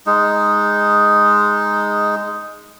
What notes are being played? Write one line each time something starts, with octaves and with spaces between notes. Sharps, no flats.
G#3 D#4